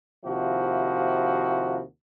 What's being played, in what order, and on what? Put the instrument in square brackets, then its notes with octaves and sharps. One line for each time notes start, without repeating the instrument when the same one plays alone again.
[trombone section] D#2 C3 F3 E4 F#4